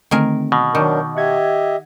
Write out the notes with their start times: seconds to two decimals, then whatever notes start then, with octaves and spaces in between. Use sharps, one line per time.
0.11 D3 D#3 A3 C4 G#4 A#4
0.52 B2
0.75 D#3 F#3 D4 A#4 C#6 D6 G6
1.16 G4 D#5 E5 F#5 G#6